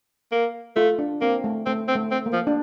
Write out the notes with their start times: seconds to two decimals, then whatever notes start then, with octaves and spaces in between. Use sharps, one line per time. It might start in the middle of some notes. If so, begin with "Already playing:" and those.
0.32 A#3
0.76 A3 F4
0.99 D4
1.21 A#3 C4
1.44 A3
1.66 A3 C4
1.88 C4
1.96 A3
2.11 C4
2.26 A#3
2.33 F3
2.47 D4